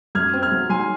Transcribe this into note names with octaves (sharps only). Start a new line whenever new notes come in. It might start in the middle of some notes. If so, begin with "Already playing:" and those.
F#2 F6 G#6
C4
F6 G#6
F#3
F#3 G#5 C6
G#5